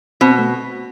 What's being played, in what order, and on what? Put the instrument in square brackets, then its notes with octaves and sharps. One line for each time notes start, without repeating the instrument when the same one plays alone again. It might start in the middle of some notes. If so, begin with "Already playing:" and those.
[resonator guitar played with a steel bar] B2 [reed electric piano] C4
[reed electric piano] A3